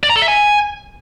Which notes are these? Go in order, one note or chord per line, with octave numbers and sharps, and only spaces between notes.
D5
A#5
A4
E5
G#5